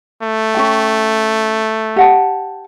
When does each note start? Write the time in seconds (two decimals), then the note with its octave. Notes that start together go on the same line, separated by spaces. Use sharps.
0.23 A3
0.55 C#4 F#4 G5
1.96 G4 F#5 A5